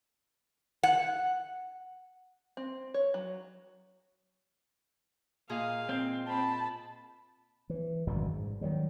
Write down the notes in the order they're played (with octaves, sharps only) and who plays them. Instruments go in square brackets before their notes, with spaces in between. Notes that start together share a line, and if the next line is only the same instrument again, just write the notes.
[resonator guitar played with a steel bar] F#5
[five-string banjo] C4
C#5
F#3
[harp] A#2 G#4 D#5 [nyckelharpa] F5
[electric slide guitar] C4
[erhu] A5 [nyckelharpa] B5
[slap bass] E3
G#1 F#2 B2 G3
G#2
D#3 E3 F#3 G3